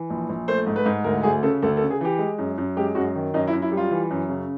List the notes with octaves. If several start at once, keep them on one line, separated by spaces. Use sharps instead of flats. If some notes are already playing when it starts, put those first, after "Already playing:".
Already playing: E3
A#1
A#1
A3 C5
G#2
B4
G#2
D2 A#4
D2 G#4
C#3 A4
D2 A4
A4
C#3
G#4
E3 G4
G#3
F#2
F#2
G#3 G4
F#2 F#4
D#3
F#2 D#4
E4
F#2
E4
G3
F4
E3
F#2
C#3